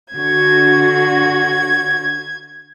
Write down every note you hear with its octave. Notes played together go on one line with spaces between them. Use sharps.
D3 F#4 G#6